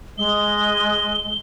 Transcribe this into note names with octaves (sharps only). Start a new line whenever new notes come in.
G#3 D#5 G7